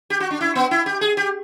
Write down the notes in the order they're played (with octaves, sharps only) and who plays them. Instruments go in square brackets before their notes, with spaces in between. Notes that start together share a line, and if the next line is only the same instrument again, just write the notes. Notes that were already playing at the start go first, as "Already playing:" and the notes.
[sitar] G4
F#4
D4
E4
B3
E4
G4
G#4
G4